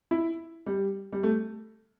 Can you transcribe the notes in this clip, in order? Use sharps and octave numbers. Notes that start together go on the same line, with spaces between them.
E4
G3
G3
A3